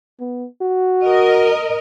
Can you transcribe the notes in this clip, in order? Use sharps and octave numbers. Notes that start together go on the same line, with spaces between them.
B3
F#4
A#4 D#5